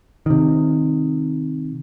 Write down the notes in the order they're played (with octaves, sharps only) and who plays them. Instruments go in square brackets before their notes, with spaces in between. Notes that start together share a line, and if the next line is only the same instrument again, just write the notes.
[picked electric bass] C3 D#3